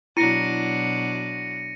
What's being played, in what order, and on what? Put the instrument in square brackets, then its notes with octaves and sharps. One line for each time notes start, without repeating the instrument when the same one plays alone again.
[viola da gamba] B2 F#3 D4 [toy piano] E4 [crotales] A#6 C#7 D#7